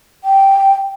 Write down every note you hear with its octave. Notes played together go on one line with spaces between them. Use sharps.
G5